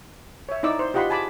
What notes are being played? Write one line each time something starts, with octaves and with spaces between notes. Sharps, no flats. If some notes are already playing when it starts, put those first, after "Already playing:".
C#5 E5
D#4 E4 D5 E6
C5
F4 G4 D#5 F#5 B5 C6
G#4 G#5 A5 B5 D6